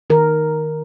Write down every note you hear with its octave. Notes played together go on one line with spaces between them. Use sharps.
D#3 A#4